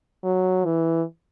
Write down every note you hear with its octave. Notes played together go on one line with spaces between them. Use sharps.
F#3
E3